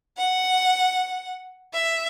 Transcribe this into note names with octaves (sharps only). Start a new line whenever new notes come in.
F#5
E5